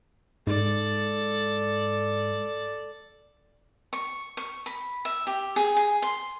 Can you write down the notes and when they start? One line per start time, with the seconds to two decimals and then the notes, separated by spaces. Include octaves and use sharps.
0.47 G#2 A4 D5
3.93 C#6
4.37 C#6
4.66 B5
5.05 E5
5.27 G4
5.56 G#4
5.77 G#4
6.02 C6